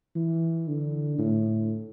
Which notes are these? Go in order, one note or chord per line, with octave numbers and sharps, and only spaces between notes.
E3
D3
A2